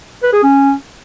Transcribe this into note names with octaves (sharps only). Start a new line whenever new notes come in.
B4
G#4
C#4